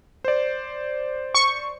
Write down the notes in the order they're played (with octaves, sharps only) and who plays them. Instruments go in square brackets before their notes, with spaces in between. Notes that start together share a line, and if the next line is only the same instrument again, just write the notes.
[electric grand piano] C5 D5
[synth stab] C#6